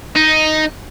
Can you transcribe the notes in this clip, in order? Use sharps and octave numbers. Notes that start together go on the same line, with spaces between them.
D#4